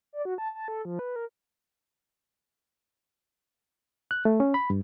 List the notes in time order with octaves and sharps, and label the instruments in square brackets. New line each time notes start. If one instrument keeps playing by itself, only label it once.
[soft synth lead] D5
F#4
A5
A5
A4
F3
B4
A#4
[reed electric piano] F#6
A3
C#4
B5
G2